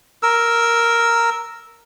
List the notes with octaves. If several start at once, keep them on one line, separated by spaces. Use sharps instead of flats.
A#4 E6